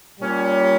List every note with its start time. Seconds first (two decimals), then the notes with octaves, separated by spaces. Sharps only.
0.19 A#2 G3 C#4